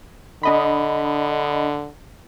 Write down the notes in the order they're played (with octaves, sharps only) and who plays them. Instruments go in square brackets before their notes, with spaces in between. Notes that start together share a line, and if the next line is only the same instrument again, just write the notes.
[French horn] D3 [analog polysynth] D4 D#5 B5